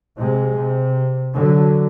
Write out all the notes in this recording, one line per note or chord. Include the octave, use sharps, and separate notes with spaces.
C3 G#3
C3
D3 F#3